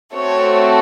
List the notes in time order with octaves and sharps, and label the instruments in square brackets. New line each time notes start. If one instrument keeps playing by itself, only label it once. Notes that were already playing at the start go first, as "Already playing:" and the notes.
[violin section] A3 C4 F#4 A4 C#5